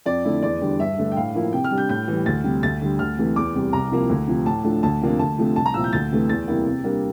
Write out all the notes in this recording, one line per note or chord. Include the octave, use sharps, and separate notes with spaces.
F2 D5
D3 A3 E4
E2 D5
D3 G3 D4
G2 E5
D3 A3 D4
G5
A2 F5
F3 A#3 E4
C3 G5
F6
G3 D4
G6
A2 G6
E3 G3
D2 A6
C3 G3
D2 A6
D3 G3
D2 F6
C3 E3 A3
E2 D6
C3 G3
C2 A#5
C3 F3 A#3 E4
D2
C3 F3
A2 A5
F3 A3 D4
D2 A5
C3 F3 A#3 D4
D2 A5
C3 F3 A3 D4
C2 A5
A#5
A#2 F3 C4 E4 E6
G6
D2 A6
C3 E3 A3
E2 A6
C3 G3 A#3 E4
C3
G3 A#3 D4